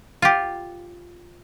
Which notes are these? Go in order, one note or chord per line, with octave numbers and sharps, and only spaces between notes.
F4 G4